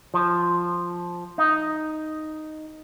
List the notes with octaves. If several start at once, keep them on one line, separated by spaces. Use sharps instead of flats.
F3
D#4